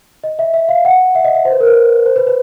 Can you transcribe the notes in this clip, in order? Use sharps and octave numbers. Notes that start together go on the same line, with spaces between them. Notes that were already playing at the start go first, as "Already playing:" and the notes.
D#5
E5
E5
F5
F#5
E5
D#5
E5
C5
B4
A#4
B4
C5
B4
B4